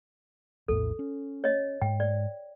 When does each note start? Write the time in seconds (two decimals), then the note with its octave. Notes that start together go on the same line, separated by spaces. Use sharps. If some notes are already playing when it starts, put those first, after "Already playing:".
0.68 A#1 E2 A2 A4
0.99 C#4
1.44 C#5 D#5
1.82 G#2 G5
2.00 D5